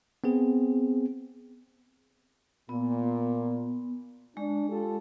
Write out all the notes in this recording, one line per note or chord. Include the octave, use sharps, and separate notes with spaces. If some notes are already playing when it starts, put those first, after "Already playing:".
B3 C4 G#4
A#2 B3
G#3 D4
F4 G4 A4